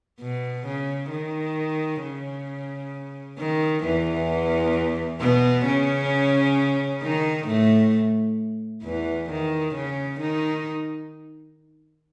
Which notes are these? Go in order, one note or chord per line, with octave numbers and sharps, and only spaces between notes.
B2
C#3
D#3
C#3
D#3
E2 E3
B2 B3
C#3 C#4
D#3 D#4
A2 A3
E2 E3
D#3
C#3 C#4
D#3 D#4